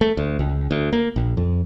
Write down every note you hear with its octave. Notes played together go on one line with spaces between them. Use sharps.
A3
D2
C#2
D2
A#3
A#1
F2